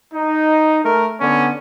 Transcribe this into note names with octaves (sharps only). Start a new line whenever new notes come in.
D#4
A3 A#4
D3 B3 C#4